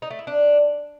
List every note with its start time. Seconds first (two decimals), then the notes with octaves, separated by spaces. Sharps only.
0.02 D#4
0.10 A3
0.19 E4
0.27 D4